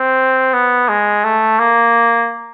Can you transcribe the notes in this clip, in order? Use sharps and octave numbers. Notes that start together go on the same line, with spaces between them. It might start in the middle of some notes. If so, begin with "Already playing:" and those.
Already playing: C4
B3
G#3
A3
A#3